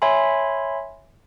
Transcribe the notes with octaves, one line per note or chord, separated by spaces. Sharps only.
C#5 E5 G#5 B5 C6